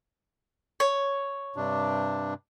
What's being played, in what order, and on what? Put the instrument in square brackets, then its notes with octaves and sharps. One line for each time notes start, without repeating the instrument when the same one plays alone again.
[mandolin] C#5
[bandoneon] G2 C3 D4